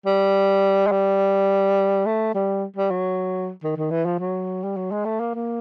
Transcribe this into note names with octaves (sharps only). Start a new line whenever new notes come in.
G3
G#3
G3
A3
G3
G3
F#3
D#3
D#3
E3
F3
F#3
G3
F#3
G#3
A3
A#3
A#3